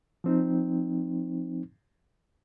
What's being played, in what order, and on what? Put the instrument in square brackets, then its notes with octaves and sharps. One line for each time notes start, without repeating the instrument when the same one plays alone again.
[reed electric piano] F3 C4 D#4